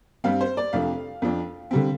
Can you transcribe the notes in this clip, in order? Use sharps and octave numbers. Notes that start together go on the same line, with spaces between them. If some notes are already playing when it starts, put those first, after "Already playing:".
G2 G3 C4 F5
C5
D5
F2 C3 F3 A3 D4 F5
F2 F3 D4
D3 G3 C4